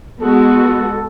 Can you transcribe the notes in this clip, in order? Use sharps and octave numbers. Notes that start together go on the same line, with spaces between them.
G#3 B3 F#4 A4